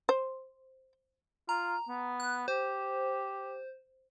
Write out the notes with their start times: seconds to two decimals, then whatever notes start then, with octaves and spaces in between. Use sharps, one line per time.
0.09 C5
1.49 F4 A#5
1.88 B3
2.20 F#6
2.48 G4 C5